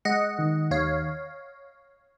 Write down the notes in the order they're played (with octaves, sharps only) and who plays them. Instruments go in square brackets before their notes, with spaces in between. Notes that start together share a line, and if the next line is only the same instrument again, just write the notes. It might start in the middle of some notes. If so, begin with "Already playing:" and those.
[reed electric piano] G#3 [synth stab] D#5 F#5
[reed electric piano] D#3
[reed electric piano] D#2 [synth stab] C#5 F5